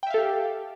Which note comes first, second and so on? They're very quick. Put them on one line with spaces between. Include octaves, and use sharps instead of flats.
G5 E5 F5 A4 G4